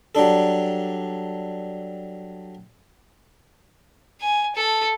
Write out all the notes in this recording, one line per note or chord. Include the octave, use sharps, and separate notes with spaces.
F#3 G3 D4 A4
G#5
A4